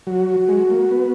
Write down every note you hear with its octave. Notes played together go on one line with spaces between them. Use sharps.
F#3 F#4
G#3
A#3
B3